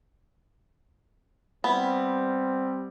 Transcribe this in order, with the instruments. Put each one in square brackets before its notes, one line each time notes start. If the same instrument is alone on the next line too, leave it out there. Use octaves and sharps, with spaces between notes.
[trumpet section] G3 C4 [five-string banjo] B3 E4